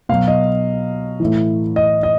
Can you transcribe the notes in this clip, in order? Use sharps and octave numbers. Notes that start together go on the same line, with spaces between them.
B2 F#3 F5
D#5
A2 E3
D#5
D#5